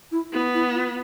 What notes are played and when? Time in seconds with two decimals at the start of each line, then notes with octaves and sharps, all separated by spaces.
0.12 E4
0.33 B3 E4
0.54 E4
0.75 F4